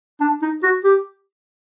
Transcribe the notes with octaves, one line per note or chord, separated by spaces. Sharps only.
D4
D#4
F#4
G4